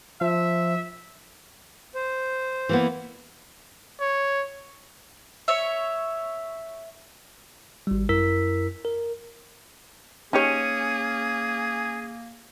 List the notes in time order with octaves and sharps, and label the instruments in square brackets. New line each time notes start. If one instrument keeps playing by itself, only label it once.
[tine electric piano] F3 [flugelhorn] E5
[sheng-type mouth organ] C5
[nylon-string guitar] E3 A#3 B3
[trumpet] C#5
[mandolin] C#5 E5
[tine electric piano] G#1 G3
F#2 E4 A#4 E6 B6
A#4
[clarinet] A#3 [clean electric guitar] C#4 [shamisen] D#4 G4 C#5 [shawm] G#4